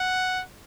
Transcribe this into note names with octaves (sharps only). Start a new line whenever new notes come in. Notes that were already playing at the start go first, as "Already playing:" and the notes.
Already playing: F#5